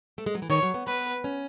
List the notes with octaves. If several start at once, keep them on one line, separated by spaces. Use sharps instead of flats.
A3
G#3
F#3
E3
D#3 C#5
F#3
B3
B3 B4
C#4